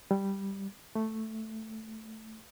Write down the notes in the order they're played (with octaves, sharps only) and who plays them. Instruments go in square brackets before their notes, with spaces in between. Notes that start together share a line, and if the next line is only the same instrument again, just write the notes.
[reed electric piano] G3
A3